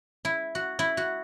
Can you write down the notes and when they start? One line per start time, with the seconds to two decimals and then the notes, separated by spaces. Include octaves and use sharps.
0.25 E4
0.55 F#4
0.79 E4
0.97 F#4